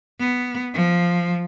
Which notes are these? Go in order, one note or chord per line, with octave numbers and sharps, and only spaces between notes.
B3
F3